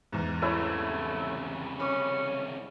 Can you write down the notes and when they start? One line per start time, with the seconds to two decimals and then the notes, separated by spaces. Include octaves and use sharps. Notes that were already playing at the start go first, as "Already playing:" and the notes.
0.12 E2 G#2
0.42 C2 C#3 A3 E4 C#5 E6
1.80 C#4 B5 C#6 D6